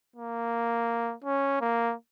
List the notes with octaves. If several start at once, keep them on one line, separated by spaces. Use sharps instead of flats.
A#3
C#4
A#3